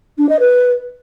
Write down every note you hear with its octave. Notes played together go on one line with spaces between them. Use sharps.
D4
D#5
B4